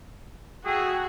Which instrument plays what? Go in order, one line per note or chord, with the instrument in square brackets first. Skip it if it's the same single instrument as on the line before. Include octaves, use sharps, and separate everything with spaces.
[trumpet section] A3 G#4 [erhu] F#4 [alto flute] G5